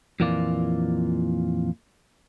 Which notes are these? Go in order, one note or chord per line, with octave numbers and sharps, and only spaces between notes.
F2 A#2 E3 A#3 F4 D5